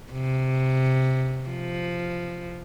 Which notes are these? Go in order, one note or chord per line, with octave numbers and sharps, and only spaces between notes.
C3
F3